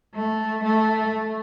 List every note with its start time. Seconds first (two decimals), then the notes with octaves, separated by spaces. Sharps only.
0.14 A3
0.64 A3